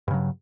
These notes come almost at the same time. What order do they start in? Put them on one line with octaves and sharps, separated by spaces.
G2 C#3 F#3